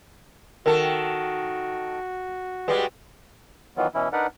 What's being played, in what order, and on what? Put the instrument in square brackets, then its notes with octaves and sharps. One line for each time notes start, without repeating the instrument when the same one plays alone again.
[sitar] D#3 A4 [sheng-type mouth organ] F#4 [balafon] A#4
[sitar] G3 G#3 [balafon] B4
[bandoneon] D#3 E3 F#3 B3 F4
B2 E3 C#4 E4
D4 D#4 A#4 B4 D5 F#5